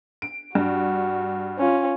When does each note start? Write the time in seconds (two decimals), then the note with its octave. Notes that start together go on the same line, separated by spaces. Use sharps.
0.22 D7
0.55 G2 F#4
1.59 C#4 F4